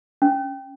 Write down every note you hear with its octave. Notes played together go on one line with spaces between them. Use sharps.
C#4